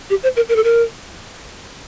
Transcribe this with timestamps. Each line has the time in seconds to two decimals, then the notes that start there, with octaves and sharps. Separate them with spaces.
0.10 G4
0.23 C5
0.36 A#4
0.49 A#4
0.56 A4
0.64 A#4